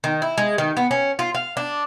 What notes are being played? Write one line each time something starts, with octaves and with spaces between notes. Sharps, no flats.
D#3
E4
G#3
D#3
B3
C#4
F4
F5
D4